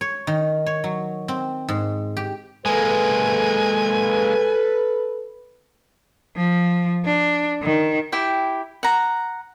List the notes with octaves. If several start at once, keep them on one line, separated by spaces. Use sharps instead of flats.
C#5
D#3
C#5
F#3
C4
G#2
G4
G#3 A#3 A4 B4 G#5
F3
D4
D#3
E4 G4 G5
F#5 A#5